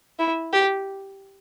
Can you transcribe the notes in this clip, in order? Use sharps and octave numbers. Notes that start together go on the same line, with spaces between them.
E4
G4